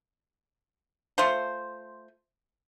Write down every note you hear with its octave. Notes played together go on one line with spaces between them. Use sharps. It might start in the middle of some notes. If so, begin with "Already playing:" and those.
A3 F4 C5